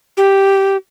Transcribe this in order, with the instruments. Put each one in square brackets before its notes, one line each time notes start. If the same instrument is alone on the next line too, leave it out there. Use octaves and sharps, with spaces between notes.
[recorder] G4